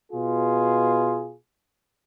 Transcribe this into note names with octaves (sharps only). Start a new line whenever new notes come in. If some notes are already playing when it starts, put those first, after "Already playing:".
B2 F4 G#4